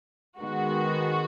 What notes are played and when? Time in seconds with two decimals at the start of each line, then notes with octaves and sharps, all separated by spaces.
0.40 D#3 G#3 B3 F#4